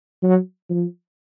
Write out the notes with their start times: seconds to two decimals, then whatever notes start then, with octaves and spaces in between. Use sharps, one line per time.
0.23 F#3
0.70 F3